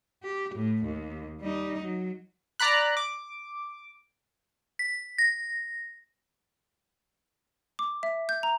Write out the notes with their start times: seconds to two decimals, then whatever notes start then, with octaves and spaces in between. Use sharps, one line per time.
0.23 G4
0.55 A2
0.84 D#2
1.41 G3 D#4
1.84 F#3
2.60 D5 A#5 B5 F#6
2.97 D6
4.79 B6
5.18 A#6
7.79 D6
8.03 E5
8.29 G6
8.43 A#5